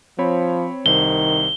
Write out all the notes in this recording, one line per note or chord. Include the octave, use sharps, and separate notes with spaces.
F3 C4 C#5 B5
C2 D#3 C5 G7